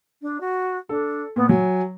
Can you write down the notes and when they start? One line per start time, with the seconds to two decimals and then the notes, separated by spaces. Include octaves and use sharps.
0.22 D4
0.40 F#4
0.89 D4 A4
1.36 A#2 B3
1.49 F#3 G#5